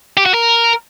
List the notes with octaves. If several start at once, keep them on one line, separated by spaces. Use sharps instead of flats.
G4
F#4
A#4